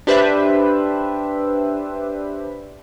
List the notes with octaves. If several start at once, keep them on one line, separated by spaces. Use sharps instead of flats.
D4 G4 B4 C5 E5